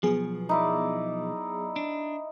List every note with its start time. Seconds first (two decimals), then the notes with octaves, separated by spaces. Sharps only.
0.03 B2 F3 F#3 B3 G#4
0.49 D#4 E4 D5
1.76 D4